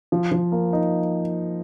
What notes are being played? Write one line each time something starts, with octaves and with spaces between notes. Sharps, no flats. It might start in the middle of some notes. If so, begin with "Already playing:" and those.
F3
F3
A#3
D#4